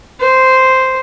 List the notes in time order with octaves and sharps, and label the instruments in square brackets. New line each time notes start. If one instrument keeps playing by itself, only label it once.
[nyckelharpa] C5